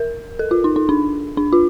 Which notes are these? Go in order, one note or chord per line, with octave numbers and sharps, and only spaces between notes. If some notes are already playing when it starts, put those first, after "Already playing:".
Already playing: A#4
A4
F4
D#4
D#4
D4
D4
F4